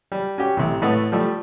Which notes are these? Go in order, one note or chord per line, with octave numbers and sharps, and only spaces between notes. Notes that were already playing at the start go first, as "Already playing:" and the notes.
G3
C#4 F#4 G4
A1 C3
A2 A3 B4 C#5 F#5 D#6
F3 G3 A3